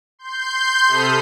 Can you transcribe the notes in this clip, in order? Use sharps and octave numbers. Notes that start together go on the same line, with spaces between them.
C6 G6
C3 A4 B5 D#6 F6